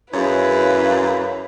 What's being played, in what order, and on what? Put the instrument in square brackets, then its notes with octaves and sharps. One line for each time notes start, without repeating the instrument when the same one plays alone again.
[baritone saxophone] F#2 [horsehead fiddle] E4 F5 [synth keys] G#4 C#5 [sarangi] B4